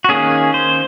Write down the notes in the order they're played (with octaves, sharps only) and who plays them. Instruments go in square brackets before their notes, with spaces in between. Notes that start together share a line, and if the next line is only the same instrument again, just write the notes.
[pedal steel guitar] F#4
D#3 A#3 C#4 G#4
C5